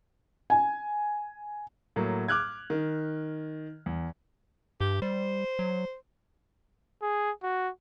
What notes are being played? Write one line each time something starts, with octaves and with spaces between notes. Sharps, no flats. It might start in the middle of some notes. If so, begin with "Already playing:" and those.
G#5
A2 F#3 A#3
D6 F6 F#6 G#6
D#3
E2
G2 G4
G3 C5
F#3
G#4
F#4